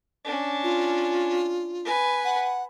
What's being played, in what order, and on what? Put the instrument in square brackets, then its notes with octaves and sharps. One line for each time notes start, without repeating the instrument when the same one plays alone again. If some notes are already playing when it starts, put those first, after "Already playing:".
[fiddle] C#4 D4
[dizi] F4
[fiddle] B4 G#5
[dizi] F#5